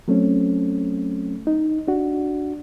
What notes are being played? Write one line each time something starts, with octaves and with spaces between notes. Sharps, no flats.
F#3 A3 C4 C#4
D#4
D4 F#4